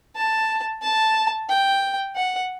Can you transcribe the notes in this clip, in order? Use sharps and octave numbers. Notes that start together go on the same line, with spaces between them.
A5
A5
G5
F#5